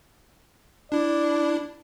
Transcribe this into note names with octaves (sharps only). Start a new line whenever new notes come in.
D4 E4 D5